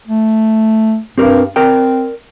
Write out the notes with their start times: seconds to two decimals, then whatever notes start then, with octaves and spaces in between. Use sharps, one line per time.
0.08 A3
1.18 G2 C4 G4 A#4
1.56 C4 A#4 D5 G5